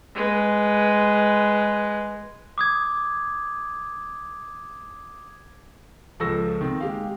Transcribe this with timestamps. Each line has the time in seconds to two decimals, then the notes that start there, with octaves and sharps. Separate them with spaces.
0.15 G#3 B4
2.58 D6 D#6 G#6
6.20 C#2 F3 A4 C#6 E6 A#6
6.61 D#3 C4
6.80 G#3 G4 F5